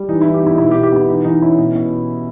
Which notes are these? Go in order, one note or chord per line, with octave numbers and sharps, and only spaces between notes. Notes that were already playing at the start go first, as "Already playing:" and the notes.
Already playing: G3
E3 D#4
E3 E4
G4
B3 E4
D#4
B2 E4
G4
B2
G4
B3 E4
E3 D#4
E3 D#4
C#4 E4
B2
B2